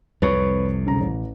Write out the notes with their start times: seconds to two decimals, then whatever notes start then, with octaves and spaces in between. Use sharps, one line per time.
0.22 C2 F2 C3 B4 C#5 C#6
0.86 B1 C#3 A#5
1.01 A1